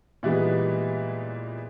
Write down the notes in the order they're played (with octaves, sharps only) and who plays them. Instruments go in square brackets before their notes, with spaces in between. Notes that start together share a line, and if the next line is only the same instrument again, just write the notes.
[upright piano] A#2 E3 G3 G#3 B3